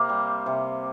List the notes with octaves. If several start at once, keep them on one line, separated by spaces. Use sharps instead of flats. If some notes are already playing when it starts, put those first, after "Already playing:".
Already playing: C3 A#3 C4 G4
G3
C3